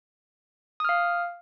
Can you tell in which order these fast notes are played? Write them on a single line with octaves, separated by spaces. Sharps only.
D#6 F6 F5